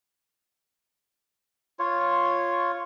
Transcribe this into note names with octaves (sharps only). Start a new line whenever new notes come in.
F4 C#5